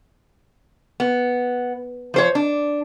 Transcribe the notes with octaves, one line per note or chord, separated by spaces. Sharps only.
B3
F3 C5 C#5
D4